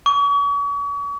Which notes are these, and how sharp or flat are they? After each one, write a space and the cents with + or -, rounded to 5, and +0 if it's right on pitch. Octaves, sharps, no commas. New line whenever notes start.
C#6 +40